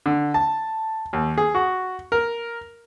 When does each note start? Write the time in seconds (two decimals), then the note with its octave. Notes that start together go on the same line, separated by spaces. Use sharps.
0.06 D3
0.34 A5
1.13 D#2
1.38 G#4
1.55 F#4
2.12 A#4